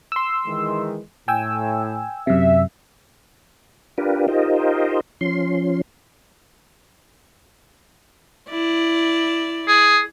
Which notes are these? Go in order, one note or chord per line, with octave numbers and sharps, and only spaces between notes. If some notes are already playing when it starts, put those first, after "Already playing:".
C6 E6
D#3 E3 G#3
A2 G5 G#5 E6
F#2 C3 E5
D4 F4 G4 A#4 B4
D#4 F4 G4 A#4 C5 D#5
F3 C#4 C6
E4 D5
G#4